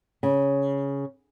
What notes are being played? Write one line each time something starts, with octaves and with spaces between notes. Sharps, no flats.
C#3